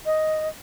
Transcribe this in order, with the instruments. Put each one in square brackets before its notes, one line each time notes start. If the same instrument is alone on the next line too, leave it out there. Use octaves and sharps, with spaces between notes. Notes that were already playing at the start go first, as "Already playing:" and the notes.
[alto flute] D#5